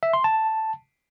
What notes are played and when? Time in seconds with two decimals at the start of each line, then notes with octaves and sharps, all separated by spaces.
0.03 E5
0.13 C6
0.24 A5